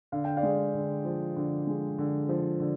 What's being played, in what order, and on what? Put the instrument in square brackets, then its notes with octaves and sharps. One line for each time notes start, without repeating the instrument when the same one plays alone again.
[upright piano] D3 F5
G5
D5 F5
G#3
D3
F3
D3
G#3
D3
F3
D3